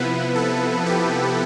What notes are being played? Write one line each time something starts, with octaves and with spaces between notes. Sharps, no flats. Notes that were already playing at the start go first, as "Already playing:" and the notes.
Already playing: C3 F3 B3 E4 B4
A4
G4